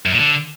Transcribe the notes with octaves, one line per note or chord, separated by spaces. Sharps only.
F#2
A#2
D3